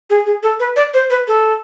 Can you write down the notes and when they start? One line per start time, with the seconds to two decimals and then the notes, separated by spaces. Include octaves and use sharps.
0.10 G#4
0.26 G#4
0.43 A4
0.60 B4
0.76 D5
0.94 C5
1.10 B4
1.28 A4